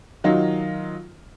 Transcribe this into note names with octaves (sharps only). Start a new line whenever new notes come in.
D#3 F#3 D#4 F4